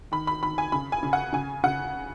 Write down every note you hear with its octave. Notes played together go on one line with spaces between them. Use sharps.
D#3 B5
B5
D#3 B5
G#5
C#3 B5
G#5
C#3
F#5
C#3 G#5
C#3 F#5